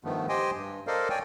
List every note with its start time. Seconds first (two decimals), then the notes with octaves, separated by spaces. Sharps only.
0.04 G2 D#3 F3 A3 B3
0.29 G4 C5 D#5 G5 G#5 C6
0.54 G2
0.87 A4 A#4 C5 D5 D#5 F5
1.10 C#5 D5 G5 G#5